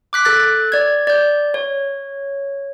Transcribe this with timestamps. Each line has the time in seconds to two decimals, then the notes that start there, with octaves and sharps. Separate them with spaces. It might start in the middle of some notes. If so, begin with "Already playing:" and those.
0.13 D6 F#6 B6
0.25 A4 F#6 A6
0.72 D5 G#6
1.07 D5 G6
1.54 C#5